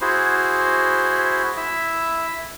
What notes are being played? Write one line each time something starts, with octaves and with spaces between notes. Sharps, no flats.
E4 F#4 G#4 C5
E4 E5